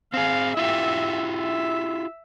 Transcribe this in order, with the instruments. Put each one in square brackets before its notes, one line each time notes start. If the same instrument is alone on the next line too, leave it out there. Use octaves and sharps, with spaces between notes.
[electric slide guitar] C4 G#4 [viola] F5
[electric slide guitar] E4 F4 G4 [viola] E5
[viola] E5